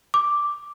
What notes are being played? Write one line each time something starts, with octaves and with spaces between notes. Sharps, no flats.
D6